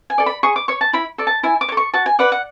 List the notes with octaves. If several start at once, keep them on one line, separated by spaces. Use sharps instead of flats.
G#5
A4 D5
B5
G#4 C#6
D6
C#5 C#6
A5
E4 B5
A4 D5
A5
E4 G#5
D6
C#5
A4
C#6
F#4 A5
G#5
B4 D5 F#5
F#5